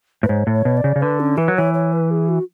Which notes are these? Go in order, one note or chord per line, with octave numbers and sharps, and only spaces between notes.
A2 B4
G#2 C#5
A2
C#5
B2
D5
C#3
C#3
D3 B4
C#4
E3 B4
F#3
E3 C#5
C#5
B4
G#4
F#4